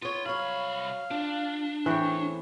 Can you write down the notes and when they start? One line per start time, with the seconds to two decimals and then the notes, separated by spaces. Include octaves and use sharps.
0.02 B3 F4 C#5
0.26 C2 F#3 C#5 F5 B5
1.11 D4 F4
1.86 E2 A2 E3 C4 C#5 G5